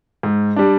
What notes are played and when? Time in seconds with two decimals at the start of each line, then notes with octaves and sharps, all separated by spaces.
0.23 G#2
0.56 G3 D4